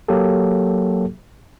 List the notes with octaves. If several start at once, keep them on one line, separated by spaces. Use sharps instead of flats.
F#3 A#3 F#4 G4 A4